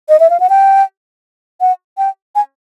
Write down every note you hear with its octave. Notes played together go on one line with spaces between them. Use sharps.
D#5
E5
F5
F#5
G5
F#5
G5
G#5